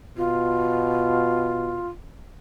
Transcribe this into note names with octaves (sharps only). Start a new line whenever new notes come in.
B2 F4